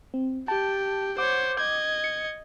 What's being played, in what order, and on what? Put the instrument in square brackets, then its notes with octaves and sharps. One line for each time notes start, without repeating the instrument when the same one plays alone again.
[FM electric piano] C4
[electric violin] G4 [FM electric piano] A5
[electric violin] C5 C#5 [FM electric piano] F#5 D6
[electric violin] D#5 G#6
[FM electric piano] C#7